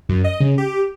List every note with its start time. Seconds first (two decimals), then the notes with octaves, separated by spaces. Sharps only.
0.09 F#2
0.24 D#5
0.40 C#3
0.58 G4